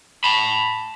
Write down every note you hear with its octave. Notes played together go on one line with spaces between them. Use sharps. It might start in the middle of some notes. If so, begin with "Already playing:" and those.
A5 B5